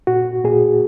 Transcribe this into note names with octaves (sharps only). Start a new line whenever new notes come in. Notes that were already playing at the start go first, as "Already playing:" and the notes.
A#2 F#4
A#2 G#4